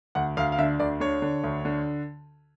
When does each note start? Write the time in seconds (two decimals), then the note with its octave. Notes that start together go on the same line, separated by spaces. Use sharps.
0.15 D2 F#5
0.37 D2 F5
0.52 F5
0.59 D3 E5
0.79 D2 D5
1.00 D3 C#5
1.22 D3
1.44 D2
1.65 D3